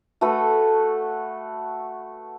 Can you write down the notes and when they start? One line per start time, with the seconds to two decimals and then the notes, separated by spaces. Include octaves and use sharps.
0.21 A3 F#4 A4 B4